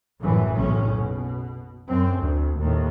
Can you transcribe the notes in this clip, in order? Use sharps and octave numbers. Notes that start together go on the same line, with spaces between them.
G1 F#2 A2 E3
F#1 B1 A2 C#4
B2
F#2 C4
D2
D#2 A2